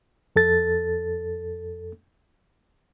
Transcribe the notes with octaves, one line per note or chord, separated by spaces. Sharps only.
F2 A4 A6